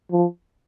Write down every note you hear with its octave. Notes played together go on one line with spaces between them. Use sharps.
F3